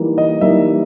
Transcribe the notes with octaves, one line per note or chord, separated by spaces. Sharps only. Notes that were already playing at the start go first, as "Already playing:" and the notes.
Already playing: E3 G3 A#3 D#4
D#5
E3 G3 A#3 D#4 E5